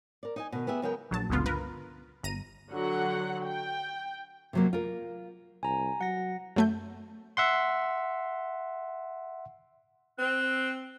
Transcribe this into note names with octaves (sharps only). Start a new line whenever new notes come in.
A#4 D5
D#4 D#5 G#5
B2 D#3
B3 G4 G#4 E5
C#3 F#3 G#3 B3 A#4 G5
A#1 F#3 A5
G1 C#2 D3 B3 F4
A#4 B4
G1 A#5 D#7
D3 F#3 F#4 F#5
G5
C3 F#3 A#3
F4 A#4
C2 G#5 A#5
F#3 F#5 A#6
F#2 A3 G6
E5 F#5 C6
C4 F#6